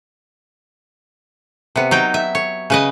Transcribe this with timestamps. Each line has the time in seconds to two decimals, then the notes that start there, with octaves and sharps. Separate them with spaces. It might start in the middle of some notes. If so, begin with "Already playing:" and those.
1.76 C3 B3
1.91 F#3 D#4 G5
2.14 E5
2.35 C#5
2.70 C#3 B4 D#5